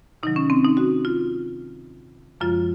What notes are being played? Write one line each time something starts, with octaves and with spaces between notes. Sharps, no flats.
C3 D#3 F#3 D#4
C#4
C4
D#4
F#4
F4
F#2 C#3 F3 G#3 F4